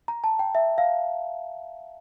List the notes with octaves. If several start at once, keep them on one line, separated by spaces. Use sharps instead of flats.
A#5
A5
G5
E5
F5